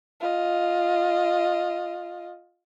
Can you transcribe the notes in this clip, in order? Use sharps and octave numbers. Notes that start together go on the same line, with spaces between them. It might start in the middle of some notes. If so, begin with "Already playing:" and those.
F4 D#5